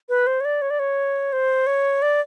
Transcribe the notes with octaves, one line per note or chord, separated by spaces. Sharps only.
B4
C5
C#5
D5
C#5
D5
C#5
C5
C#5
D5